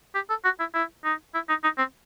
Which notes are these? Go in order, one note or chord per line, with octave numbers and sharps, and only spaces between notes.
G4
A4
F#4
E4
E4
D#4
E4
D#4
D#4
C4